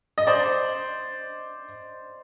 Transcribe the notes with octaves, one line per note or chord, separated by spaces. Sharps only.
D#5
C5 D5